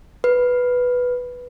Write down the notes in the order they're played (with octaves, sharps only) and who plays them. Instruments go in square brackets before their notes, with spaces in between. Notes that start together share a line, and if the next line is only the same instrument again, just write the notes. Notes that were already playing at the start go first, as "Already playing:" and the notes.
[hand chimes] B4